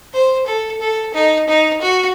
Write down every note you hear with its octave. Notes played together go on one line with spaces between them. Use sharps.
C5
A4
A4
D#4
D#4
F#4